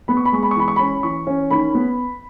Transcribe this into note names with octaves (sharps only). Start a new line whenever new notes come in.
B3 B5
C#6
B5
G#3 C#6
B5
C#6
E3 B5
C#6
C#4 B5
E3 C#6
C#4
D#3 B5
B3